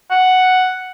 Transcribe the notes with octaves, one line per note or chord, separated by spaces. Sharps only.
F#5